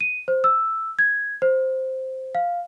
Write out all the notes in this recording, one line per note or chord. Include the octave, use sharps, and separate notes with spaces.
D#7
C5
E6
G#6
C5
F5